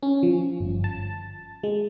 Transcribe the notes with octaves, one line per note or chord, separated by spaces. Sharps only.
C#4
F3
G1
A5
G#3